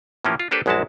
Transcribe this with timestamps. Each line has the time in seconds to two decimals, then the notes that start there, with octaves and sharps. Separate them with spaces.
0.25 A2 E3 F3 A#3 C#4 G4
0.40 F4
0.51 A#3 D4 G4 A4 B4 C5
0.66 A#1 F#2 G#3 E4 F#4 A5